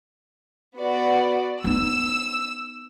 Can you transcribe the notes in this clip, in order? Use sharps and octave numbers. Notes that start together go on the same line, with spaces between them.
B3 F#4 D5
B3 D#4 E6